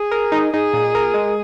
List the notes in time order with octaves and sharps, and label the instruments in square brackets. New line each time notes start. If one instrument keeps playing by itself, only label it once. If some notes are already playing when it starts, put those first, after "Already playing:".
Already playing: [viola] G#4
[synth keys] A#4
D#4
[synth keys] D#4 [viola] G#4
[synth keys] A#2
A#4
G#3